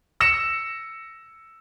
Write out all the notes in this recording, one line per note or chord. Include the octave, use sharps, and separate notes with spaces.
E6 A#6 C#7 E7